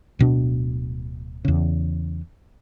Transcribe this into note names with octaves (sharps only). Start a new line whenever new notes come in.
D1 B2 D4
E2 C#3